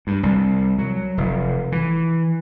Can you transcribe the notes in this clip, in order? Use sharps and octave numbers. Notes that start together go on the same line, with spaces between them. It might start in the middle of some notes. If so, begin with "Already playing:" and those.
G2
C2
F#3
F1
E3